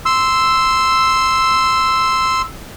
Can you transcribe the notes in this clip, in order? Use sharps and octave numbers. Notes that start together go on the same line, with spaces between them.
C6 E6